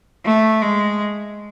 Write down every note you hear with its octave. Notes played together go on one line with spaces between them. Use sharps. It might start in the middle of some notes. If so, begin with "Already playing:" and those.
A3
G#3